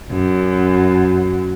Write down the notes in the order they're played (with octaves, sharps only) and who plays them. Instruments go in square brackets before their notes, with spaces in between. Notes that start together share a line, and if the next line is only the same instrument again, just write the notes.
[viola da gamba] F#2